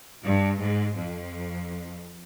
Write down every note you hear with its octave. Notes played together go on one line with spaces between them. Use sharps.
G2
G#2
F2